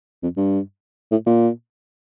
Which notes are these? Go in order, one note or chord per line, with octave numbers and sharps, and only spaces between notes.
F2
G2
A2
A#2